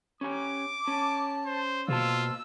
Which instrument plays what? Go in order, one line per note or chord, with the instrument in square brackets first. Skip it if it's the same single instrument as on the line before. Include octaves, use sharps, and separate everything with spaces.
[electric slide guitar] C#4 G4 G#5 [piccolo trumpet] D6
[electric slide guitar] C#4 [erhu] A5
[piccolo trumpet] C5
[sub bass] B2 [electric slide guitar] A#3 C5 A5 [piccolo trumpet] F4 [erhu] E6